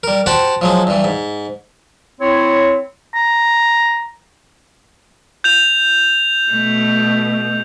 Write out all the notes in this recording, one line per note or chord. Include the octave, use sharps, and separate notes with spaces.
G3 A#4
F#4 G4 C5 F#5 A5
F3 F#3 G#3
G2 E3
G#2
C4 E4 C#5
A#5
G6 F7
B2 A3